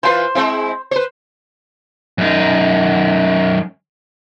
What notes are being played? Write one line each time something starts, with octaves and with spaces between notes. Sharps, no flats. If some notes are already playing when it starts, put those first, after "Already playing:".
E3 F4 B4 C5 C6
G#3 C4 E4
B4 C5
F#2 D#4